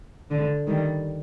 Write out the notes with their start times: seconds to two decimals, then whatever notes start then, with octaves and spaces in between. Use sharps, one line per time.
0.31 D3
0.67 D#3 G3